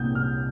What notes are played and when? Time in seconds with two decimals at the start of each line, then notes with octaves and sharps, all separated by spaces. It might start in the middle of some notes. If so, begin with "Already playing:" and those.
Already playing: C2 A#2 D#6 G6
0.15 C2 F6